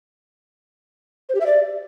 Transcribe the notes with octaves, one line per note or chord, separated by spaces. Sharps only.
C5
G4
E5
D5